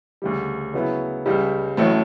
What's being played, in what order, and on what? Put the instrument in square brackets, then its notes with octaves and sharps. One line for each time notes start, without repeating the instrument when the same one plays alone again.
[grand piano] D2 C#3 G3
C#3 F#3 B3 E4
C#2 C#3 G3
A1 A2 F#3 A3